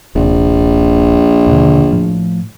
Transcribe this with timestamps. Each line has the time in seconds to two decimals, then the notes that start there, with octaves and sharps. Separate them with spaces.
0.15 D#1 A#1 C3
1.46 D#2 B2 D3
1.92 A2 F3